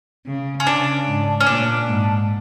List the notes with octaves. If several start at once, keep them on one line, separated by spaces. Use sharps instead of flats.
C#3
C#4
C#3 D4
G#2
C#4
A#2 D4
G#2